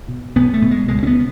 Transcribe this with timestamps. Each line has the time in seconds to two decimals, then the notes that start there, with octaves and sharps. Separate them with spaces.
0.08 B2
0.36 B1 B3
0.54 A3
0.62 B2
0.71 G#3
0.88 C#2 G#3
1.03 C#4
1.07 B3